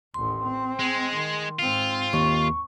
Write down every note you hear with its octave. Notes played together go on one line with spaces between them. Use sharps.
A1 D#2 C6
C4
G#3
D#3
G#2 C4 F4
D#2 C#6